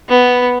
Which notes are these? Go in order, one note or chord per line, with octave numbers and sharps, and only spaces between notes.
B3